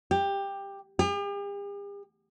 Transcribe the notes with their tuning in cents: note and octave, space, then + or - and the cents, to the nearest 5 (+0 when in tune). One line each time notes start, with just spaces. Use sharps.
G4 +15
G4 +45